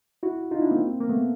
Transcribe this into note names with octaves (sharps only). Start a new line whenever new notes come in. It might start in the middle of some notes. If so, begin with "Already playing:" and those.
E4 F#4
D#4 F4
D4 E4
A#3 C4
A#3
A3 B3